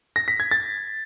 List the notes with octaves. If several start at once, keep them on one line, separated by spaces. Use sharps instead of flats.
A#6
B6
G#6
A6